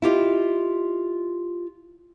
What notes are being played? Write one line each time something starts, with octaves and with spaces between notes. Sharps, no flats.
E4 F4 G4 D#5